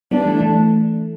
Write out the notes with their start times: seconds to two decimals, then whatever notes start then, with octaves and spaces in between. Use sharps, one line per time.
0.11 G3 B3 D4
0.26 E3 A3
0.41 E3 A3